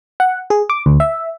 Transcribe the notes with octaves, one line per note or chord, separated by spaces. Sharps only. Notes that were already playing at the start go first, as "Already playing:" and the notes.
F#5
G#4
D6
D2
E5